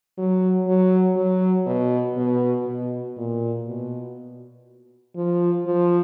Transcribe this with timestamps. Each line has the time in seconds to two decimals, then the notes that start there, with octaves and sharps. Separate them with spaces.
0.18 F#3
0.68 F#3
1.17 F#3
1.67 B2
2.17 B2
2.67 B2
3.17 A#2
3.67 B2
5.16 F3
5.66 F3